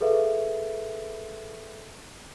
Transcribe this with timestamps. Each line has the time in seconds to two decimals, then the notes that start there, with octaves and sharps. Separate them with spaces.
0.01 G#4 A4 B4 E5 F5